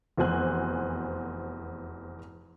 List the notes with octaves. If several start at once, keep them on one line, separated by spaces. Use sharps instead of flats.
F1 E2 F#4 C5 G#5 F#6